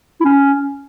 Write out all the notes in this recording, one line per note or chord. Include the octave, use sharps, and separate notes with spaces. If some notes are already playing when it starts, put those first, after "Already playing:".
E4
C#4